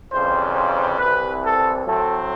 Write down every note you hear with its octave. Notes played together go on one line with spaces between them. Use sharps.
F2 C#3 E3 G3 C5
C5
C2 C3 E3 B4
A4
A2 F#3 A3 C4 A4